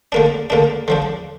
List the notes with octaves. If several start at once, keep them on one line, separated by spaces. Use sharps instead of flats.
D3 A#3 D4
D3 A#3 D4
D3 F3 D4